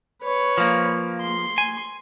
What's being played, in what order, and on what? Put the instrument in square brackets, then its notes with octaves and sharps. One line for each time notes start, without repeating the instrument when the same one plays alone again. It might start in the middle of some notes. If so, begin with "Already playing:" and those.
[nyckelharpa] B4 C#5
[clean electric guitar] F3 A#3
[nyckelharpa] C6
[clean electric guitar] G#5